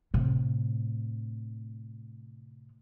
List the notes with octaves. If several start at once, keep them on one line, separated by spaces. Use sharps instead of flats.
A2 C3